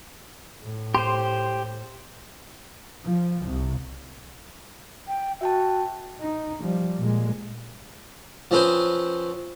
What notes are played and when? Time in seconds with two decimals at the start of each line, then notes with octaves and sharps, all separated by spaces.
0.63 A2
0.95 G4 C5 C6
3.03 F3
3.43 C2
5.08 G5
5.41 F#4 E5 G5 A5
6.21 D#4
6.62 F3 G3
6.99 A#2 G#3
8.51 F3 C4 C#4 B4 C5